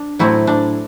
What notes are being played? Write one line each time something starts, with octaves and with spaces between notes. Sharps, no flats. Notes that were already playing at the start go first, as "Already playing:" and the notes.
Already playing: D4
A2 F#3 A3 C4 E4
D4